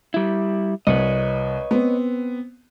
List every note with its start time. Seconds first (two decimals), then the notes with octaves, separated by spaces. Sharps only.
0.14 G3 E4
0.87 C2 B4 C#5 D#5
1.71 B3 C4